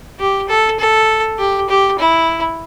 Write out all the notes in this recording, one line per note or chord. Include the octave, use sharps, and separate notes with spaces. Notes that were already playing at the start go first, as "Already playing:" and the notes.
G4
A4
A4
G4
G4
E4